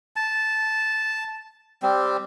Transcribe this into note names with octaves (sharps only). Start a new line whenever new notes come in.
A5
G3 C4